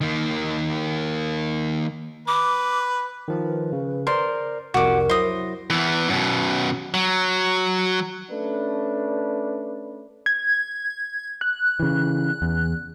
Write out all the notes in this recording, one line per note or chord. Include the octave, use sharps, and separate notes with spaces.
D#3 A#3
B4 D6
D#3 F3
B4
C#3
A#4 C5 D5 C6
C2 F2 G3 F#4 A#4 D6
F#3 E4 C5 D#6 A#6
E2 E3
F#2 B2
F#3
A3 C#4 D4 B4
G#6
F#6
C#3 E3
E2